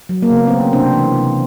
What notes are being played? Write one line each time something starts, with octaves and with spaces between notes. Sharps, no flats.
F#3
A#3
C#3 B3
A3 C4
C#4
C3 C4 D4
E3
C3